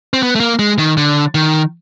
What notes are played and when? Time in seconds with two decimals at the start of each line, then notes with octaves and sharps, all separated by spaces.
0.14 C4
0.23 B3
0.35 A3
0.40 A#3
0.59 G#3
0.79 D#3
0.97 D3
1.35 D#3